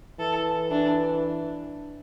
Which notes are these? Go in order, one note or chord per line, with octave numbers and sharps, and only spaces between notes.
E3 A4
E3 D4